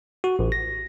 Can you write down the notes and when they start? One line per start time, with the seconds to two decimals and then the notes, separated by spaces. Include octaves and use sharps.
0.24 F#4
0.39 A1
0.52 A#6